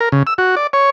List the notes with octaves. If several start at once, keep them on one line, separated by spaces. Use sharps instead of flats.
A#4
C#3
E6
F#4
D5
C#5